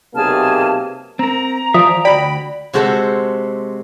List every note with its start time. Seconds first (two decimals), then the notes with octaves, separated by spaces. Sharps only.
0.15 B1 C3 A#3 G#4 A5 F6
1.19 C4 A#4 A#5
1.74 E3 F3 D5 E5 D#6
2.05 D2 F#4 D5 G5 B5
2.73 C3 G#3 F#4 A4 C5 A5